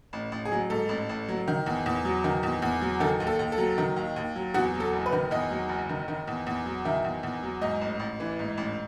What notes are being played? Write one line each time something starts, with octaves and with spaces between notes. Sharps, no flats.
A1
A1
G#4
F#3
G#2 A4
A1
A1
F#3
D#3
E2
E2
F#3
D#3
E2
E2
F#3
D#3 A4
D#2
A4
D#2
A4
F#3
D#3
D#2
D#2
F#3
E2 F#4
F#3
A4
F#1
B4
D#3
E2 D#5
F#3
F#1
D#3
D#3
E2
E2
F#3
D#3 E5
E2
E2
F#3
G#2 D#5
A1
A1
E3
G#2
A1